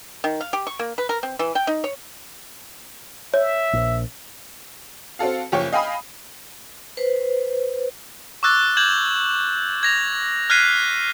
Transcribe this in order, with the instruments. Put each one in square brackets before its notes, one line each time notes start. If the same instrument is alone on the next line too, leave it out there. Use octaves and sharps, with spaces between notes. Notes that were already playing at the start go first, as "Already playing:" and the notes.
[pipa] D#3
F5
G4
C#6
A#3
B4
A#4
C4
E3
G5
D#4
C#5
[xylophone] C#5 [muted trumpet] E5
[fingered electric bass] A#1
[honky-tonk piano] C4 F#4 A4 F5
F#1 F3 C#5 G5 C#6
D#5 F5 G5 G#5 B5 D#6
[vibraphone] B4 C5
[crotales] C#6 D6 E6 F#6 A6
G6 G#6 E7 F#7
G#6 A#6 F7
F6 F#6 G#6 B6 C7 D#7